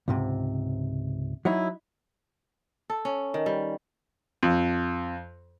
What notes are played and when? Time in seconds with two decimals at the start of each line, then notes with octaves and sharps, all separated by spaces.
0.08 C#2 G#2 C3
1.45 F#3 D#4 E4
2.90 A4
3.05 C#4
3.34 D#3
3.46 G3
4.43 F2